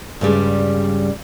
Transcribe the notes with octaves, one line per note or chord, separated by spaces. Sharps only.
G2 C#3 G3 G#3